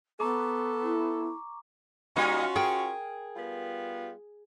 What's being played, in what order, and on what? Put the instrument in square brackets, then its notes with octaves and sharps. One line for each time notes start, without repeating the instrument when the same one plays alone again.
[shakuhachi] B3 [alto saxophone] A4 [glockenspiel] A#5 C#6 D6
[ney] E4
[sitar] G3 A#3 D#4 [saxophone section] C#4 F4 F#4
[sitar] G#4 [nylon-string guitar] A#4 G5
[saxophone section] G3 B3 F4